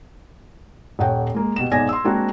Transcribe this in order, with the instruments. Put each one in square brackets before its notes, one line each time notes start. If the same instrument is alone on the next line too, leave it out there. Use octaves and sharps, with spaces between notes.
[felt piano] D#1 C#5 F#5 G5
G#3 A#3
B2 G4 E7
B1 G#2 D5 G#5 G#6 A#6
C6 E6
G#3 A#3 C4 D4 F#4